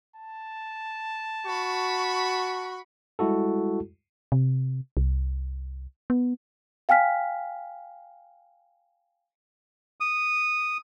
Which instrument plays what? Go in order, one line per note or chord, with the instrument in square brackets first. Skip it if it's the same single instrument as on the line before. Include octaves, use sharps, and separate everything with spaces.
[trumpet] A5
[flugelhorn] F#4 [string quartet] B5 C#6
[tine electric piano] G3 G#3 E4 F#4 A4
[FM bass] C3
C2
B3
[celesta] F5 G5 G#5 F6 B6
[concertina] D#6